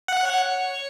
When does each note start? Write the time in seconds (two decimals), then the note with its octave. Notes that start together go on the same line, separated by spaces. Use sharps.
0.08 F#5
0.24 C#5